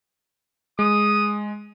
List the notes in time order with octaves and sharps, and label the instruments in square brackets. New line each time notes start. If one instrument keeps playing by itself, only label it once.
[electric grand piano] G#3 [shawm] D#6